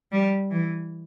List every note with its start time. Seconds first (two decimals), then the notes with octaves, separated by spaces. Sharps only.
0.12 G3
0.51 E3